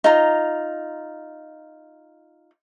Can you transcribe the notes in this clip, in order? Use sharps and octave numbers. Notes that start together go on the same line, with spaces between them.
D#4 F4 A#5